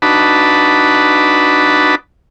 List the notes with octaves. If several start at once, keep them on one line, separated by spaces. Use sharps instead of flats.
D4 D#4 F#4 B4 A5 B5